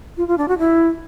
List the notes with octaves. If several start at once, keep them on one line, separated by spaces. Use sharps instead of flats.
F4
F4
D4
F#4
E4